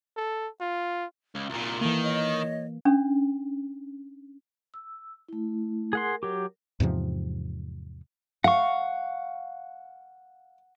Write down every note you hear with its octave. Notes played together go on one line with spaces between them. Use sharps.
A4
F4
C#2
C2 A#2 A#5
D#3 E3 A#3 A4
C#5 D#5
C#4 D4
E6
A3 E4
G#4 A#4 F#5 C6
F#3 G4
E2 G#2 C3 F3
F5 F#5 C#6